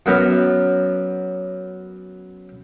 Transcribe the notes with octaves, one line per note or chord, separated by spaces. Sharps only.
F#2 F#3 B3 A#4 A#5